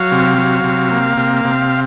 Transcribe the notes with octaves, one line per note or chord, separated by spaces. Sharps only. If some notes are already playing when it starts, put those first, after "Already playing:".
Already playing: F#3 F5
C3
F#3
C3
A#3
C3
C3